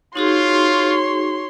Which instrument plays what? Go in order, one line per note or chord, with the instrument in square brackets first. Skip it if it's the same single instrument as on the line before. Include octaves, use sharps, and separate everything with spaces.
[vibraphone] D#4 F#4 G#4 [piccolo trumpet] F4 [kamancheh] C#5 C6